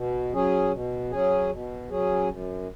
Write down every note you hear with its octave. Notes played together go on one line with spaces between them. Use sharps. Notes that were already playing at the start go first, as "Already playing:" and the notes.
Already playing: B2
F#3 C#4 G#4
B2
F#3 C#4 G#4
B2
F#3 C#4 G#4
F#2